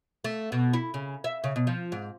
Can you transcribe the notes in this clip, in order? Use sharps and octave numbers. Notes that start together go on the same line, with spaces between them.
A3
B2
E4
C#3
E5
C#3
B2
F3
G#2